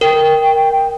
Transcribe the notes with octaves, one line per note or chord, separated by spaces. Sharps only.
A#4 G5